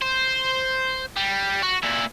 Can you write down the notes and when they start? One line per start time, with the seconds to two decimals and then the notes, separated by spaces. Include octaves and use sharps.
0.02 C5
1.17 G3
1.63 F#4
1.83 A#2 E4